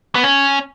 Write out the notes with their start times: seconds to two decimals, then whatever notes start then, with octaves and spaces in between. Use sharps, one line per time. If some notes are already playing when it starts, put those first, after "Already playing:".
0.15 B3
0.23 C#4